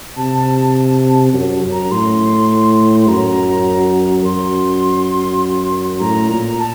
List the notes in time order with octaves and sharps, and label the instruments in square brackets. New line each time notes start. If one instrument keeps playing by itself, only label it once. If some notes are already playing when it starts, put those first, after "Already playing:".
[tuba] C3 [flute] A5
[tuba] F#2
F#2
[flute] A#5
[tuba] A2 [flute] C6
[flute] C6
[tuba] F#2 [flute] A#5
[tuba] F#2 [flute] C6
[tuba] A2 [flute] A#5
[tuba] A#2
[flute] A5